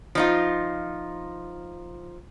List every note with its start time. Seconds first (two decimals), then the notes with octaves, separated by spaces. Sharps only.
0.15 F3 D#4 F4